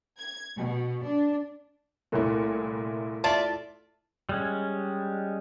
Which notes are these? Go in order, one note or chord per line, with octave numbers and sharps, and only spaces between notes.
G#6
B2
D4
C2 A#2 A3 E4 C#5
F4 D5 E5 A5
G3 G#3 C#4